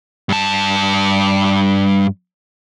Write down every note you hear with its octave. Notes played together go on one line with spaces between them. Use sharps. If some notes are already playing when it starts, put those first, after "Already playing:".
G2 A5